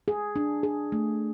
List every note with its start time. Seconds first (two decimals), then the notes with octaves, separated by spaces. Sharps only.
0.08 G#4
0.36 D4
0.63 G#4
0.92 A3